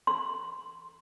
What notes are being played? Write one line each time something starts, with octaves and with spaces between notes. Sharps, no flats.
C6